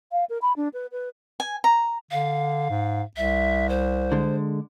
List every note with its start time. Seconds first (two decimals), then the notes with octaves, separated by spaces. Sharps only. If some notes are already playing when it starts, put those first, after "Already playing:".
0.12 F5
0.29 A#4
0.42 B5
0.56 D4
0.73 B4
0.92 B4
1.40 G#5
1.64 A#5
2.11 D3 F5
2.70 G#2
3.17 C2 E5
3.69 C5
4.12 D3 G#3